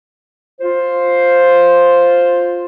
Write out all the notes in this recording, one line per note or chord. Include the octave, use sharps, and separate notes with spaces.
F4 C5